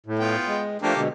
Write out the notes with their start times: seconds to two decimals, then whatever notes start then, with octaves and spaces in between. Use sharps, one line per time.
0.06 A2
0.19 B3 F4 G5
0.47 G#3
0.82 F3 A3 A#3 D4 G4 A4
0.96 B2 D3 G#3